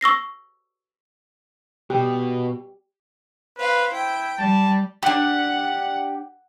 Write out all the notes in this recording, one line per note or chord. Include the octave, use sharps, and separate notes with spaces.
C#6 E6 A#6 C7
B2 G4
B4 C5 F5
E4 G5
G3 A5
D4 G4 F#5